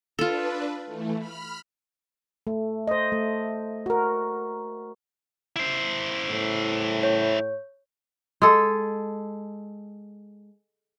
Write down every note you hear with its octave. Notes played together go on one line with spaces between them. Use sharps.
D4 F4 A4 B4
E3 A3
B5 F6
A3
C5 D#5
A3
F#4 A#4
E4 C5
A2
C#5
G#3 A4